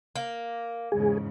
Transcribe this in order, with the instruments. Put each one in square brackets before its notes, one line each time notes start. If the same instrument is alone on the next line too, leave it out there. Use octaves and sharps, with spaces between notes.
[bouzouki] A#3
[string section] E2 G#2 C#3 [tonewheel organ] G#4